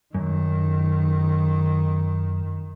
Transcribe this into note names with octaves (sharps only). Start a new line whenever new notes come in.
F#2 D#3